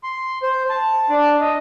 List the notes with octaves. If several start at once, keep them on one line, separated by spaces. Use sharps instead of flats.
C6
C5
A5
D4
D#5